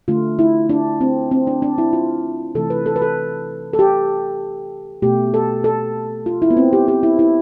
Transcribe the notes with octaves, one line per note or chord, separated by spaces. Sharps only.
D3 A3 F4
E4
D4
C4
C4
D4
D4
E4
F4
C3 E3 A3 A4
B4
A4
B4
A4
A4
G4
B2 A3 G4
A4
A4
F4
E4
B3
C4
G4
G4
E4
E4